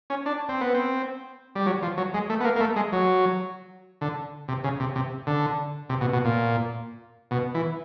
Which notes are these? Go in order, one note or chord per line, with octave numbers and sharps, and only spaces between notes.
C#4
D4
C4
B3
C4
G3
F#3
F3
F#3
G#3
A3
B3
A#3
A#3
A3
G#3
F#3
D3
C3
C#3
C3
C3
D3
C3
B2
B2
A#2
B2
E3